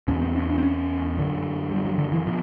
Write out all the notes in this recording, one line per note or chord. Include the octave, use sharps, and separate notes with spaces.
E2 B2 C#4
C4
C#4
D4
C4
C#4
F#2 D3
G3
F#3
D3
E3
B2 F3